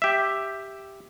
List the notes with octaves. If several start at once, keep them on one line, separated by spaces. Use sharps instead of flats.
G4 E5